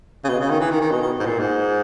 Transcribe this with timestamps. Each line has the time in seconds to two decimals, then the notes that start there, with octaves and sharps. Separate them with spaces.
0.24 C#3
0.29 B2
0.40 C#3
0.50 D#3
0.60 E3
0.71 D#3
0.81 D#3
0.91 B2
1.01 B2
1.19 G#2
1.26 A#2
1.39 G#2